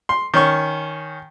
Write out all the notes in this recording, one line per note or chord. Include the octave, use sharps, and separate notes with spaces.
C6
D#3 C#4 C#6